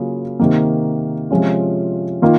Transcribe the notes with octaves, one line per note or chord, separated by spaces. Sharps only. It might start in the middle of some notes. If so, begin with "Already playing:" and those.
Already playing: C#3 F#3 A#3 F4 G#4
C3 D#3 A#3
C3 F3 G#3 C#4 F4
D#3 A#3 F4